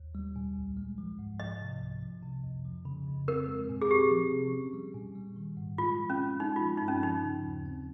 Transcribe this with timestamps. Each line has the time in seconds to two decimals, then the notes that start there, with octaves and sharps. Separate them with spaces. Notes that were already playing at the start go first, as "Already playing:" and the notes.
Already playing: D#2
0.15 G3
0.36 A#2
0.56 C2
0.77 G#3
0.98 F3
1.19 G#2
1.40 F3 D#5
1.61 C3
1.82 C2
2.02 F3
2.23 C3
2.43 F2
2.65 F3
2.85 C#3
3.07 F2
3.28 C4 A#4
3.48 G#3
3.69 A#2
3.82 G#4
3.90 C4 G4
4.11 F3
4.32 C3
4.52 C#4
4.74 G3
4.95 A#2
5.15 G3
5.36 D#3
5.57 G#2
5.78 G#3 F4
5.99 F3
6.10 C#4
6.20 A#2
6.40 G#3 D#4
6.56 F3 F4
6.77 G2 D#4
6.88 C#4
7.03 F3 D#4
7.24 C#3
7.45 D#2
7.66 C4